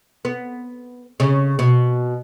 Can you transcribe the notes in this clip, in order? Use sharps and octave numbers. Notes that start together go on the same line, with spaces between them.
B3
C#3
B2